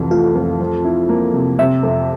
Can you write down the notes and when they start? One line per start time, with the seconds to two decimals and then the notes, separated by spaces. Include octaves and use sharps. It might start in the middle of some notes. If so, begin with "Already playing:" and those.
Already playing: C2 F2 E3
0.11 A3 F4
0.35 F2
0.60 F3
0.84 E4
1.09 A#3
1.34 C3
1.59 C3 E5
1.83 F2